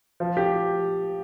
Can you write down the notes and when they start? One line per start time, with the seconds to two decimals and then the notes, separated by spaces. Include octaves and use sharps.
0.20 F3
0.37 G4